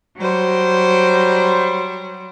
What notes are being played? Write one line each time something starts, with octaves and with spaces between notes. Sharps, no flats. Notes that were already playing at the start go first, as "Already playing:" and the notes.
F#3 G3 C5